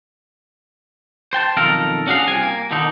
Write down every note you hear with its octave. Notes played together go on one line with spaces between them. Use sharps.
C5 G5 A5
B1 F2 D#3 A4 A#4 F5
C#4 D4 F#4 G#4 F5
C2 C4 G#5
A#3
B2 D3 D#3 D#4